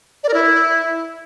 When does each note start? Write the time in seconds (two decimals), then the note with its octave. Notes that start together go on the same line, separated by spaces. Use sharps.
0.24 D5
0.29 A#4
0.34 E4